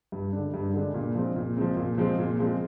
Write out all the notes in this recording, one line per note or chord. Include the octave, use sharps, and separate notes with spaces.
G2
D3 G#3 D4
G2
D3 G#3 D4
A#2
F3 G#3 C4
A#2
F3 G#3 C4
A#2
F3 G#3 C4
A#2
F3 G#3 C4